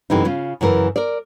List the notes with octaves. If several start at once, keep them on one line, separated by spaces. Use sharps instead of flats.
F#2 C3 E3 A3 D#4
C#3 C#4 F4
F#2 C#3 E3 A#4 B4
A#4 D5